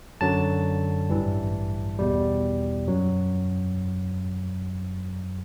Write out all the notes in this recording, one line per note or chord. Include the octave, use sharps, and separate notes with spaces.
F#2 D3 F#3 A5
A1 G2 E3 G3
E2 B2 G3
F#2 F#3